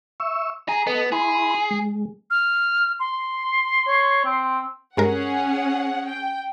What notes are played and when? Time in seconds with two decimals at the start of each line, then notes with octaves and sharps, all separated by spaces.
0.20 E5 C#6 E6
0.69 G#4 A#5
0.87 B3 A4 D#5
1.12 E4 G#4 B5 C6
1.71 G#3
2.30 F6
3.00 C6
3.87 C#5
4.25 C4
4.97 G2 G#3 C#4 G#4 A#4 F#5
6.08 G5